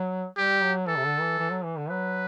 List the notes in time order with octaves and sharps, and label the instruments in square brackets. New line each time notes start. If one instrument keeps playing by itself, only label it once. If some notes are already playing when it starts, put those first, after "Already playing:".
Already playing: [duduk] F#3
[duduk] G3 [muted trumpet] G4
[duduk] F#3
[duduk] E3 [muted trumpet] A4
[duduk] C3
D3
E3
E3
F#3
E3
D3
[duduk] F#3 [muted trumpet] B4